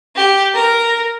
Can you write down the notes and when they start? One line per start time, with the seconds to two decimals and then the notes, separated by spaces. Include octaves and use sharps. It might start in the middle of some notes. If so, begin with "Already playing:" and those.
0.16 G4
0.54 A#4